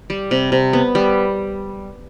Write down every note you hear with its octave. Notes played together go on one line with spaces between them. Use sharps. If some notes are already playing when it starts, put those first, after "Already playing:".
G3
C3
C3
B3
G3